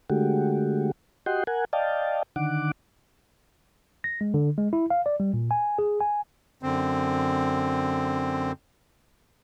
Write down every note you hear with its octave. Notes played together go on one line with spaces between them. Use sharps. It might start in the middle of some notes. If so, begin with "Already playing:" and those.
D3 G#3 A3 F#4 G4
F#4 G4 D#5 F#5 G5 C6
A#4 F#5 G#5
D5 D#5 F5 G5 A5
D3 D#3 F#5 D6
A#6
G#3
D3
G#3
E4
F5
D5
G3
A#2
G#5
G#4
G#5
F#2 D3 C4